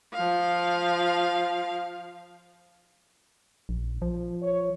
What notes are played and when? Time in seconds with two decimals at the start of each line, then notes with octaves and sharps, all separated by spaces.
0.13 F3 F5
3.69 A#1
4.02 F3
4.42 C#5